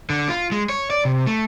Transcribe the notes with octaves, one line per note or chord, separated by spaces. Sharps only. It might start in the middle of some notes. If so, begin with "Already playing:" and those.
D3
F4
G#3
C#5
D5
C3
A3